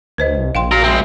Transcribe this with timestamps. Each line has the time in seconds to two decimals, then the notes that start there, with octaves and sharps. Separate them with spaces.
0.18 D2 B4 C5 D#5
0.37 C2
0.55 A#1 F5 G5 C6
0.71 F4 F#4 A#4
0.84 G#3 C4 E5